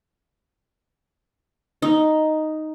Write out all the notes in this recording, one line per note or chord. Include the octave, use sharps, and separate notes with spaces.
D#4